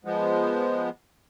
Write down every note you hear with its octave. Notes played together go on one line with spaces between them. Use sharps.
F3 G#3 B3